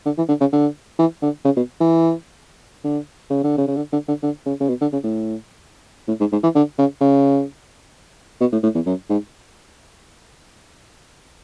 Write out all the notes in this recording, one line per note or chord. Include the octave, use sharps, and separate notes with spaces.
D3
E3
D3
C#3
D3
E3
D3
C#3
B2
E3
D3
C#3
D3
C#3
C#3
D3
D3
D3
D3
C#3
C#3
B2
D3
C#3
A2
A2
G#2
G#2
E3
D3
C#3
C#3
B2
A2
A2
E2
F#2
G#2